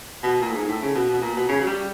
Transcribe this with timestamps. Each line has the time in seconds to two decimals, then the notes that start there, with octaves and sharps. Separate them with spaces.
0.23 B2
0.41 A#2
0.50 A2
0.54 G#2
0.68 A2
0.82 C#3
0.95 B2
1.09 B2
1.21 A#2
1.36 B2
1.48 C#3
1.61 F#3
1.66 G3